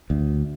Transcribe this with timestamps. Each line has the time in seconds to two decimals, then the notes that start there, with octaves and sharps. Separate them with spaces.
0.10 D2